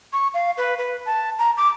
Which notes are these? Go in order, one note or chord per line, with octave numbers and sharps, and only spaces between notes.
C#6
F5
B4
B4
A5
A#5
D6